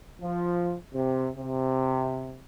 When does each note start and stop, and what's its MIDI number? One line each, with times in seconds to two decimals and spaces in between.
0.21 0.75 53
0.93 1.28 48
1.36 2.39 48